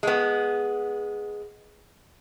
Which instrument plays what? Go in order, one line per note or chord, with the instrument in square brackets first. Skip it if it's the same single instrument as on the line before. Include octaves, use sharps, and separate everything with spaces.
[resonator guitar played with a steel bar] G#3 B3